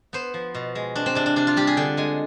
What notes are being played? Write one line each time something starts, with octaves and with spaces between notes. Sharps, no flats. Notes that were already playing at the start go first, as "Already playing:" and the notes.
B3 C5
F3
B2
G#3
C4 D4
C4
C3 D4
D4
C3 D4
F4
G3 G4
G#4
D3 G5
G#3 G#5